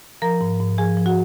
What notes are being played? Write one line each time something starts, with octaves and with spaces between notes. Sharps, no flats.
F3 A#4 A#5
G#2
G#2
F3 G#4 G#5
F3
F#4 F#5